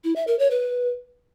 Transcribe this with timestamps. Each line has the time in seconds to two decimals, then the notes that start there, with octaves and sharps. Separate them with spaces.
0.04 E4
0.16 E5
0.27 A#4
0.39 C#5
0.51 B4